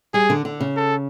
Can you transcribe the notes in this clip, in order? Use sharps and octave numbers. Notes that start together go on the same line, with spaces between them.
G3 G#4
D3
D3
C#3
A4